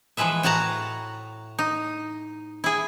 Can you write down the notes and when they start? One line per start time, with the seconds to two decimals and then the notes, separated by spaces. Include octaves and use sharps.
0.17 E3 F3 G#3 B4 E5
0.43 A2 F#4 F#5 A5 A#5
1.59 D#4
2.64 E4 G#4